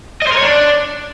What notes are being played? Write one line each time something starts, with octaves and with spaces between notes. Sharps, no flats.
D#5
C5
A#4
C#5
D4